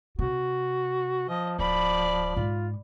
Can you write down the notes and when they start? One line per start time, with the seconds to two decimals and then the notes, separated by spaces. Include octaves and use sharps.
0.19 C3 F#4
1.29 F3 D#5
1.59 D1 F3 D5 B5
2.36 G#2 G#3 F4